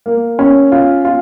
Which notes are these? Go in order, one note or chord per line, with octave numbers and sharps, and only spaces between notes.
A#3
C#4
F4
F4